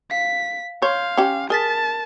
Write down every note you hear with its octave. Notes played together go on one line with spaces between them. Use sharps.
F5 B6
C#5 F5 C6 G6 G#6
C#4 G4
G#4 A#4 A5 A6 B6